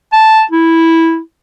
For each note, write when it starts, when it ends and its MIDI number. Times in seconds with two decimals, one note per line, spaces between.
0.13 0.42 81
0.51 1.19 64